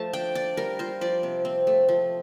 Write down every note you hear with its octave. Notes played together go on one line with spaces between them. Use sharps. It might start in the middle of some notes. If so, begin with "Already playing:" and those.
Already playing: F3 A3 A5
D4 G5
D4 D5
G3 A#4
F4 C5
F3 D5
C3
C4
A3
F3